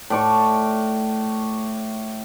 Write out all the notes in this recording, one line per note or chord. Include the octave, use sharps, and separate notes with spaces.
A2 D5 C#6